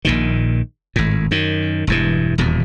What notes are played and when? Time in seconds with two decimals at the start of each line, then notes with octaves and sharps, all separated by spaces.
0.05 A#1 A#2 D#3
0.96 G#1 A2
1.31 F#2 D#3
1.87 E1 G2 E3
2.38 D#1 E2 B2